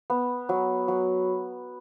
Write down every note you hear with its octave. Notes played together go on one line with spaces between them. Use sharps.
B3
F#3
F#3